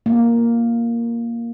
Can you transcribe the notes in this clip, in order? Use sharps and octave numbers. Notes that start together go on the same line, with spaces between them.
A#3